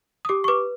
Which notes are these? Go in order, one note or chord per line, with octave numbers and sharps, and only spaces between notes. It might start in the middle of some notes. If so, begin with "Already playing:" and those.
D#6
G4 D6
C#6
B4 D6